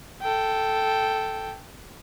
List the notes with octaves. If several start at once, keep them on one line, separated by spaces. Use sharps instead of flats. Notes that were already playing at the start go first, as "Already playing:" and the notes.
A4 G5